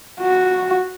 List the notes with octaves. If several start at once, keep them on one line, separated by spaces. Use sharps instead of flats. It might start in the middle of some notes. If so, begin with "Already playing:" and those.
F#4